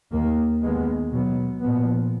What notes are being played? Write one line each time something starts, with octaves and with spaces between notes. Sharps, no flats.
D#2 D#3 A#3
D#2 D#3 G#3 B3
B2 F#3 B3
A#2 F3 B3